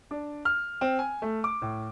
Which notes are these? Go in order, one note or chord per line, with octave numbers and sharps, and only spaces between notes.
D4
F6
C4
G#5
A3
D6
A2